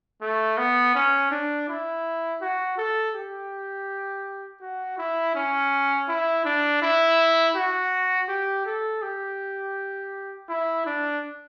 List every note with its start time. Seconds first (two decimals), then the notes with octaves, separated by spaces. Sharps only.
0.21 A3
0.58 B3
0.95 C#4
1.31 D4
1.68 E4
2.41 F#4
2.78 A4
3.15 G4
4.61 F#4
4.98 E4
5.35 C#4
6.09 E4
6.45 D4
6.82 E4
7.56 F#4
8.29 G4
8.66 A4
9.02 G4
10.49 E4
10.86 D4